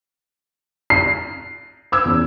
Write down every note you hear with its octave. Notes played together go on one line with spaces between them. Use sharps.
C7
D6 E6 G#6
E2 C#3